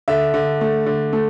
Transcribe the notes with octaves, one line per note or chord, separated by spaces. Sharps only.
D3 E5
D3
A3
D3
A3